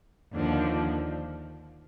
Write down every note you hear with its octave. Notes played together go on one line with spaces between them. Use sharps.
D#2 D3 F3